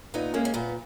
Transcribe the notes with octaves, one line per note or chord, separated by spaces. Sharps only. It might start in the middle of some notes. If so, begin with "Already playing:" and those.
A#2 B3 D#4
G#3 A#3 C#4
C#4
A#2 B3